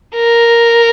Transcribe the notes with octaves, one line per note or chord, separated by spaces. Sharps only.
A#4